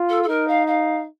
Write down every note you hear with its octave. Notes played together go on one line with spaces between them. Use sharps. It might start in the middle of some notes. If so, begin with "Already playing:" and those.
Already playing: F4
A4
A4
D#4 A#4
F5
F5